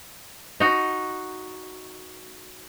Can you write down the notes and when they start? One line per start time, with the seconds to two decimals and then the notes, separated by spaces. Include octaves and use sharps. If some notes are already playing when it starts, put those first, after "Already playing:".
0.60 D#4 F#4